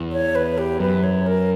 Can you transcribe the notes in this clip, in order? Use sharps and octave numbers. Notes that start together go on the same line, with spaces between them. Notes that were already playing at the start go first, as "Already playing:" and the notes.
Already playing: E2
C#5
B4
G4
F#2 B4
C#5
A#4